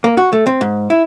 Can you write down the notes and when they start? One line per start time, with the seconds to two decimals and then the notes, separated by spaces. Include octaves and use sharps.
0.04 A#3
0.17 F#4
0.33 A3
0.47 C4
0.61 G#2
0.90 E4